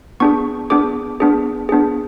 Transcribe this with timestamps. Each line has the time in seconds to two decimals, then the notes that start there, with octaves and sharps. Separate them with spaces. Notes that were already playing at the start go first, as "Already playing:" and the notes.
0.20 B3 D4 G#4 C#6
0.70 B3 D4 G#4 D6
1.20 B3 D4 G#4
1.69 B3 D4 G#4